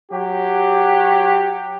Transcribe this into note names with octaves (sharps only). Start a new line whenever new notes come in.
F#3 G4